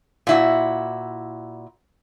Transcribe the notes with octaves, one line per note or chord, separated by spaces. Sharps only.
A#2 E4 F#4